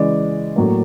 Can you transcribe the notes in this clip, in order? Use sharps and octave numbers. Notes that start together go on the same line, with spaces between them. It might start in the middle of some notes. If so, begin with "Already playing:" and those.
Already playing: C#3 E3 G#3 D5
A2 F#3 A#3